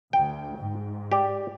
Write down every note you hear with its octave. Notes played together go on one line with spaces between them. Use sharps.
D2 G5
G#2
G4 D5